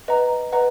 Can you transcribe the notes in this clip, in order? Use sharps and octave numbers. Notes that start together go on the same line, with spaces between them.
B4 D#5 F#5 A#5
B4 D#5 F#5 A#5